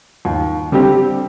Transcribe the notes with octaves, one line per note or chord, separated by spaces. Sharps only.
D#2
D3 G3 C4 G4